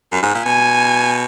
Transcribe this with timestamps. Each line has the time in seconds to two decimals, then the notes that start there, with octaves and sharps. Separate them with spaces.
0.12 F#2
0.23 G#2
0.35 A#2
0.45 B2 G#5